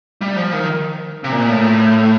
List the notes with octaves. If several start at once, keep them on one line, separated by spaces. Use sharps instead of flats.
G3
F3
D#3
C3
A#2
A2